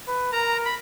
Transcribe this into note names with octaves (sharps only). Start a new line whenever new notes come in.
B4
A#4 A#5
B5